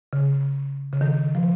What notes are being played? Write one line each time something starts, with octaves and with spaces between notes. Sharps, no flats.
C#3
C#3
D#3
F3